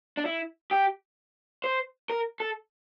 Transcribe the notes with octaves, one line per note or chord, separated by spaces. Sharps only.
D4
E4
G4
C5
A#4
A4